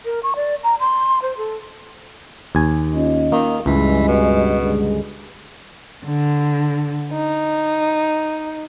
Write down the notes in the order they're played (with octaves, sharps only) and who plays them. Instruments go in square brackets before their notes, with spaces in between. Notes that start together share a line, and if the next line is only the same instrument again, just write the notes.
[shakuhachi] A#4
C#6
D5
A#5
C6
C5
A4
[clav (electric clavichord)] D#2 G#5
[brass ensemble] C#4 F4 D#5
[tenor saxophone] D#3 [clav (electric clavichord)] A#3
[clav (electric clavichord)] C#2 [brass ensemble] G2 G#3 [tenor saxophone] E3
[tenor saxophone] B2
[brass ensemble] G2 D3 G#3
[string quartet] D3
D#4